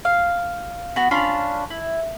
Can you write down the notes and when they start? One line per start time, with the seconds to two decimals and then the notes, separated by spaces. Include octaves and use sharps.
0.05 F5
0.96 B3 F#4
1.11 C#4 D4 F4 B5
1.70 E4